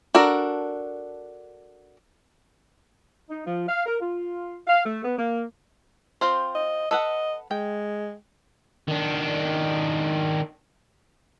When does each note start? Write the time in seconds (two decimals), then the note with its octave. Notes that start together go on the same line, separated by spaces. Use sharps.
0.15 D4 F#4 A4 A#4
3.30 D#4
3.46 F3
3.68 F5
3.86 A#4
4.00 F4
4.67 F5
4.86 A3
5.04 B3
5.18 A#3
6.21 C4 F4 C5
6.55 D#5
6.91 A4 B4 D#5 F#5
7.51 G#3 G5
8.88 D#3 D4